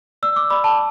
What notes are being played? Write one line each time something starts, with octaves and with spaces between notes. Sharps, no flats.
D5 E6
D6
D5 B5
A5